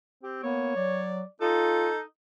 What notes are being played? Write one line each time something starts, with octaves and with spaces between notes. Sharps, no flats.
C4 G4
A#3 B3 C#5
F#3 D5
D#4 F4 A4